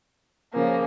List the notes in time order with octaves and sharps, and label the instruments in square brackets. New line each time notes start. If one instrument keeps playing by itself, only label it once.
[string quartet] C#3 F3 A#3 C#4